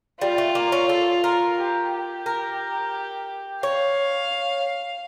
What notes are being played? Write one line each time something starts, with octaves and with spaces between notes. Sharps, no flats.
G3 F4
A3
A#3
C#4
A4
A#4
G4
G4
A#4
C#5 F5